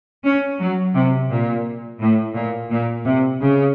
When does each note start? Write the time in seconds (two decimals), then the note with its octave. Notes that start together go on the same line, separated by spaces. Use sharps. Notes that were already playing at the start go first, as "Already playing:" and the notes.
0.24 C#4
0.60 F#3
0.95 C3
1.30 A#2
2.01 A2
2.35 A#2
2.71 A#2
3.06 C3
3.41 C#3